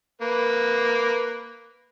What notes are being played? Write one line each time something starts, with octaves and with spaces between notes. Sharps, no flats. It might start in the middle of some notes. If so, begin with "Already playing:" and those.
A#3 B4